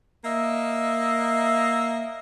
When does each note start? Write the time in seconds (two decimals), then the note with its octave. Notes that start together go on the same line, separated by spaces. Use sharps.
0.24 A#3 D#5 E5